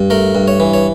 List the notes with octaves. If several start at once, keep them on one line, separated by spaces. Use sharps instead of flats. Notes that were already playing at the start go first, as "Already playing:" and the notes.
Already playing: G2
A3 A#4
G2
C#5
E3
C#5